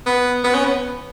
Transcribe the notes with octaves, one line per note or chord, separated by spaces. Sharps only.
B3
B3
C#4
B3